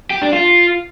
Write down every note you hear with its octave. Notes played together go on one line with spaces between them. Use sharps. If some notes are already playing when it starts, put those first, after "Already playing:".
G4
D4
F4